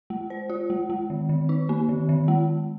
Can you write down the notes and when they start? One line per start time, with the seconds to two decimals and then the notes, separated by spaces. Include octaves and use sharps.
0.10 G#3
0.30 C5
0.50 F4
0.70 G#3
0.90 G#3
1.10 D#3
1.29 D#3
1.49 D#4
1.69 A#3
1.89 D#3
2.09 D#3
2.28 G#3